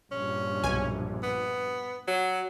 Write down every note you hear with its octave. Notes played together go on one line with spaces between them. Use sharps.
A#1 G2 C#4
B1 G#5
B3
F#3